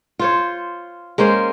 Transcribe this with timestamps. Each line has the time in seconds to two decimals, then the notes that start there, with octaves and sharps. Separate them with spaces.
0.19 F4 C5 C#5
1.18 G#3 A#3 C#4 C5